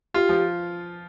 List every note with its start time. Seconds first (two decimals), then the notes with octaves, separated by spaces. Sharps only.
0.14 F4 G4
0.29 F3